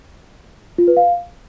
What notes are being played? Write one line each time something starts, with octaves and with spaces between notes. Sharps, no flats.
F4
B4
F5